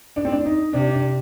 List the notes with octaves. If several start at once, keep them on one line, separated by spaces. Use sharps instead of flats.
D4
C4
D4
D#4
C3 D4
D4